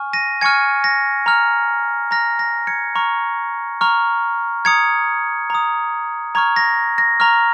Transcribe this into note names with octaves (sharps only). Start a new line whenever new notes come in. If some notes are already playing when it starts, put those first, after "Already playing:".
Already playing: G#5 C#6 F6
A#6 D#7
G#5 C#6 F6 G#6 C#7
A#6
A#5 F6
A#5 F6 A#6
A#6
G#6 C#7
A#5 C#6 F6
A#5 C#6 F6
A#5 D#6 G#6 C#7
A#5 D#6
A#5 C#6 F6 G#6
A#6
A#6
A#5 C#6 F6